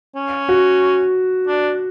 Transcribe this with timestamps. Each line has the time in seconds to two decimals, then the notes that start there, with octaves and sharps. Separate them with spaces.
0.15 C#4
0.49 F#4
1.47 D4